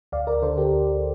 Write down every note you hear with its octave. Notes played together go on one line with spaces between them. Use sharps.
D2 D5 F5
A#4 D5
D3 A4 C5
G4 A#4
D2